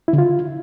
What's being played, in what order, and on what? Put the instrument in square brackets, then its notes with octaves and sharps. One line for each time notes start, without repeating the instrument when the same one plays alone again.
[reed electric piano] E4
D3
F4